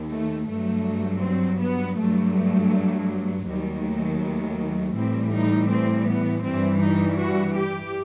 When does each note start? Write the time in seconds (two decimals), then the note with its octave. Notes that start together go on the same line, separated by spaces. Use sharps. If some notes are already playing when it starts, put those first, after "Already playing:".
Already playing: D#2 D#3
0.13 A3
0.50 G2 F#3 A3
1.24 C4
1.61 B3
1.98 G2 F#3 A3
3.47 D#2 D#3 F#3 G3
3.83 A3
4.21 A3
4.95 A2 E3 G3 C4
5.32 D#4
5.69 C4
6.07 B3
6.44 G2 E3 G3 C4
6.81 D#4
7.18 F#4
7.55 G4